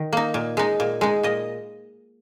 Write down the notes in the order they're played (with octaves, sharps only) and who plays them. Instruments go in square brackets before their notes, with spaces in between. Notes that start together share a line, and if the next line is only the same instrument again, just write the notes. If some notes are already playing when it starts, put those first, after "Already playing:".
Already playing: [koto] D#3
A#3 D#4
A#2
G#3 D#4
A#2
G#3 D#4
A#2 D#5